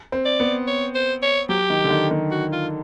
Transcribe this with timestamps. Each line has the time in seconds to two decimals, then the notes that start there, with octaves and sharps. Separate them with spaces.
0.12 C4
0.25 D5
0.40 B3
0.67 C#5
0.95 C5
1.22 C#5
1.49 F#3 G4
1.70 D#3
1.84 D3
1.90 D#3
2.11 D#3
2.31 F#4
2.52 F4